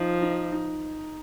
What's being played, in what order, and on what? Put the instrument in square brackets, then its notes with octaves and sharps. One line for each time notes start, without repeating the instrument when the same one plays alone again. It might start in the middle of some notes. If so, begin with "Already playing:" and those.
Already playing: [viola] F3 [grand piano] D#4
[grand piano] D#4
D#4